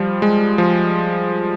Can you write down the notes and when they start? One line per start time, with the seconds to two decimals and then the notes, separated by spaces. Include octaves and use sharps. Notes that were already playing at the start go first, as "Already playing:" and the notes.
Already playing: F3 G3
0.22 G#3
0.58 F3